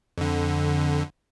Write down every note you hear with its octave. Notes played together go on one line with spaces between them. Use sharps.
F2 D3